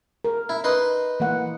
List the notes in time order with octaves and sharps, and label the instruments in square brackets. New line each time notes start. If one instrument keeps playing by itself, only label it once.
[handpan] A#4
[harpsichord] E4
D#4 B4 C6
[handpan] E3 A#3 F#5